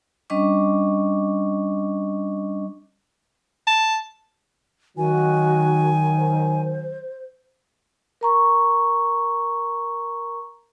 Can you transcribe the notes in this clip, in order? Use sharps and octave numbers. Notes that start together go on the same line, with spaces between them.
G3 C#4 D4 D#5 C#6 D6
A5
D#3 F#3 F#4 G#5
C5
A#4 A#5 C#6